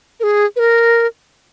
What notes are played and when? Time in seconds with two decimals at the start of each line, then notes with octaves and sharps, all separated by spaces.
0.20 A#4
0.23 G#4
0.56 B4
0.59 A#4